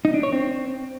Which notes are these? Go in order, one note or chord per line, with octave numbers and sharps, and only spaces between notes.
D#4
D4
C#5
C4